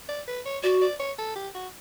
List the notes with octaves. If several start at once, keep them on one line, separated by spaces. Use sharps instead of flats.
D5
B4
C#5
F#4 D5
D5
C#5
A4
G4
F#4